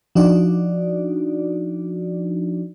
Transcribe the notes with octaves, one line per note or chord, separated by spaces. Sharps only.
F3 D4 D#4 F#4 D5